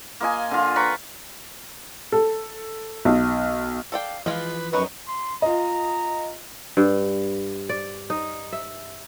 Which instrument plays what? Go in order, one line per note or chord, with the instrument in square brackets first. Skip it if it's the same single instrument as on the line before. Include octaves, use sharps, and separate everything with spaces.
[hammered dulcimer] A#3 F4 D#5 G#5
D3 F4
B4 A#5 B5 C#6
[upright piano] A4
B1
[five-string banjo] A4 D5 G5 [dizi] F5
[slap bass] E3 F3 [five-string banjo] G#3 F4 F5 [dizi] B4
[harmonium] F#2 B4 [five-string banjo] F#3 B3 D#4 [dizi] C#6
[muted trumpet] C6
[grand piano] F4 D#5 [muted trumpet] A#5
[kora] G2
D5
D#4
E5